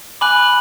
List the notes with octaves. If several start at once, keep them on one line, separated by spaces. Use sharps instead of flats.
G#5 B5 D6 F#6 F#7